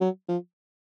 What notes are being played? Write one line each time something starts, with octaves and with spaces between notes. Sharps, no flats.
F#3
F3